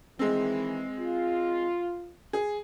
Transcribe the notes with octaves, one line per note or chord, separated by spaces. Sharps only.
D#3 E3 G#3 C4
F4
G#4